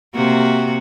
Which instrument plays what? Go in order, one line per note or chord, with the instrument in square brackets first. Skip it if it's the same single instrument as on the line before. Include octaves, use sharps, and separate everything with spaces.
[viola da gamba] C3 A#3 F#4